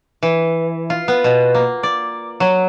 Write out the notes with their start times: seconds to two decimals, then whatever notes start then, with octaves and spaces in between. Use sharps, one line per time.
0.23 E3
0.90 F4
1.08 B3
1.24 B2
1.55 A#3
1.83 D5
2.40 F#3